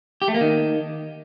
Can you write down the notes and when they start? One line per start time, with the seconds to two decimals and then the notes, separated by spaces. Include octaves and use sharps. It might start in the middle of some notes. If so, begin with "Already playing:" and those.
0.22 G4
0.28 A3
0.34 A#3
0.41 D#3